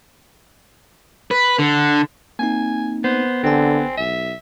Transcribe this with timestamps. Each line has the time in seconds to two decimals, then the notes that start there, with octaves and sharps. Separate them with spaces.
1.31 B4
1.58 D3
2.39 A#3 C4 D#4 G#5
3.04 B3 C5
3.43 A1 D3 C4 G#5
3.97 B1 E5